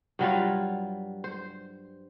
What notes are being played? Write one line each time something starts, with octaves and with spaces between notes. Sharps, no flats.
G2 F#3 G3 F4
C5